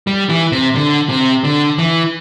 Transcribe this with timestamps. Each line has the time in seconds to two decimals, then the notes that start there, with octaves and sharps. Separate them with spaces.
0.07 G3
0.29 E3
0.52 C3
0.75 D3
1.09 C3
1.44 D3
1.78 E3